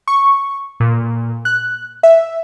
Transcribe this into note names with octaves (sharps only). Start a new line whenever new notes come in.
C#6
A#2
F#6
E5